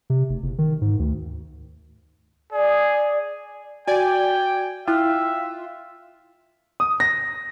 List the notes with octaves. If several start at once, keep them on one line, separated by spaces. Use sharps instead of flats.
C3
F1
F#1
D#3
G#2
D2
G#4 D5
F#4 D5 G5 G#5
E4 F4 E5 G5 F6 F#6
D#6
A#6